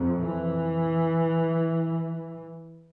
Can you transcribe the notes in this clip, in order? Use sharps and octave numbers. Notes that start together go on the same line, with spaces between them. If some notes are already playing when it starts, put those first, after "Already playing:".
Already playing: F2 C3
E3